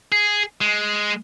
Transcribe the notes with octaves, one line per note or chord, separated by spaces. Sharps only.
G#4
G#3